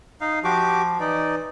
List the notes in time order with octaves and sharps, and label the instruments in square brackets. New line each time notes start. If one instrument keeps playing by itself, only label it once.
[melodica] D#4 F5
[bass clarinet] F3 [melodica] F#4 G4 D6
[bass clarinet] E3 [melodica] D#4 D5